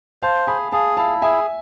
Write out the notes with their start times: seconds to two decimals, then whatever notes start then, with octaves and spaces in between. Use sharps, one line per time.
0.22 C5 F5 A5
0.47 G#4 G#5 B5
0.72 G#4 F5 A5
0.97 E4 F5 A5
1.22 G#4 E5 G#5